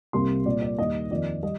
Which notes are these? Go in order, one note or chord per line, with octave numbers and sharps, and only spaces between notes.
C2 C3 G3 A#3 C6
A#2 G3 A#3 D5
D5
D#2 D#3 G3 A#3 D#5
F2 D#3 A#3 D5
G3 D#5